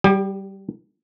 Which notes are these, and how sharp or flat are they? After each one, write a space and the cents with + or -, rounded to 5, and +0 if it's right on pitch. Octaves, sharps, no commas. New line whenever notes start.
G3 -15 G4 +40